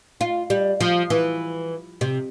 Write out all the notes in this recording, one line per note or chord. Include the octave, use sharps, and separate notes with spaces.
F4
G3
F3
E3
C3